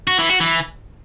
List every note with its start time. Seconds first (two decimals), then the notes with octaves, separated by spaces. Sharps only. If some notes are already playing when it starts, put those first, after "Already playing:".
0.07 F#4
0.18 E3
0.29 F#4
0.40 E3